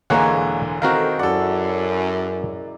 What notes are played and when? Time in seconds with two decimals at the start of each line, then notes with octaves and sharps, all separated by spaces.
0.10 E1 D3 E3 G#3 A#3 A#4 C#5 F#5
0.82 D#3 E3 C4 F#4 A4 A#4 F5
1.19 F#2 E4 A4 D5 F#5